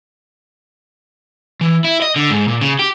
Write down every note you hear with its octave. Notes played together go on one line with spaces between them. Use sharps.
E3
E4
D#5
D3
G#2
A#2
C#3
G4